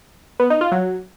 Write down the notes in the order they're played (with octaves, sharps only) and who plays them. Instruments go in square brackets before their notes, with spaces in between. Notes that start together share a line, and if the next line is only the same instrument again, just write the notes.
[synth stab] B3
D#4
F4
F#3